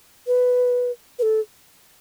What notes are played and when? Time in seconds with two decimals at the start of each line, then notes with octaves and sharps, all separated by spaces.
0.27 B4
1.19 B4
1.23 A4